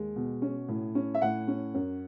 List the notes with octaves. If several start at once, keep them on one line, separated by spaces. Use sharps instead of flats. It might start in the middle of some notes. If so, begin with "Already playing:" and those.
Already playing: D#2 G#3
B2
C#4
A2
C#4
E5
A2 F#5
C#4
F#2